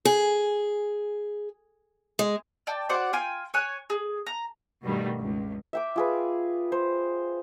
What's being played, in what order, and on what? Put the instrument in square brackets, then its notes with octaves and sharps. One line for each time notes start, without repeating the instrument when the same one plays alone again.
[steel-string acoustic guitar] G#4
G#3
[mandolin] D5 G5 A5
F#4 C5 D5 F#5
F4 G5 G#5
C#5 G#5 F#6
G#4
A#5
[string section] G2 B2 D#3 G3 A3
C#2
[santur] E5 G5 D6
F4 G#4 B4
C5